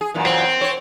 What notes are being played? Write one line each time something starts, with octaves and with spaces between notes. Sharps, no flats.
G#4
F#2 A#2 E3
C4
C5 C#5